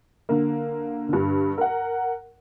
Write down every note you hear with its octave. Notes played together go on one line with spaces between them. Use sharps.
D3 A#3
G2 D3
A#4 F#5